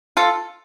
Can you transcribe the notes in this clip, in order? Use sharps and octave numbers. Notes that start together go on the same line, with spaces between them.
F4 A4